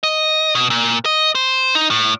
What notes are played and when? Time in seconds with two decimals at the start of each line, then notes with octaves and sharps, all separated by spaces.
0.03 D#5
0.55 B2
0.70 A#2
1.05 D#5
1.35 C5
1.75 D#4
1.90 A2